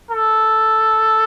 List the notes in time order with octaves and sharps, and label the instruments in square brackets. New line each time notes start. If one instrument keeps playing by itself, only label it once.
[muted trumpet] A4